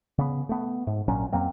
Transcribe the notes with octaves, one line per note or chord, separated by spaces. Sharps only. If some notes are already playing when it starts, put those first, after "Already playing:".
C#3 B3
A3 B3
G#2
A#1 A#2 F#3 C#4
F2 F#3 A#3 C4